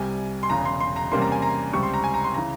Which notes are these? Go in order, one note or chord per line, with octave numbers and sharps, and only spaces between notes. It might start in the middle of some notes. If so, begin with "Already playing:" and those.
Already playing: C2 C3 G3 G#5
C6
E1 E2 C#3 A#5
C6
C6
A#5
E2 C3 G3 A#3 C#4 C6
A#5
G#5
A#5
C#2 C3 G3 C4 C#6
C6
A#5
G#5
A#5
C6
C#3 E3 A#5